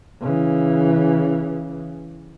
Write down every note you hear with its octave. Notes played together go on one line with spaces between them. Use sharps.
C#3 E3